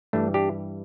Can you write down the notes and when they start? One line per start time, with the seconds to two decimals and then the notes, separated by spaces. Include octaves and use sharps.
0.13 G2 E3 G3 A3 D4
0.34 D4 G4